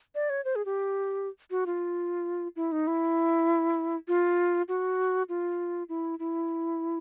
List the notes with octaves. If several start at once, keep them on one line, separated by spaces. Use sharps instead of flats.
D5
C#5
C5
G#4
G4
F#4
F4
E4
D#4
E4
F4
F#4
F4
E4
E4